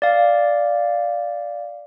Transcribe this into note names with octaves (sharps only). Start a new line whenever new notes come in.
D5 F5